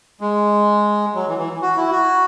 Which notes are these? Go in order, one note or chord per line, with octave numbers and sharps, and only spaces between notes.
G#3
F#3
E3
E3
F#4
E4
F#4